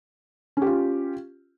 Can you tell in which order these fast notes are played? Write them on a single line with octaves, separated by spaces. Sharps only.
C#4 G4 F4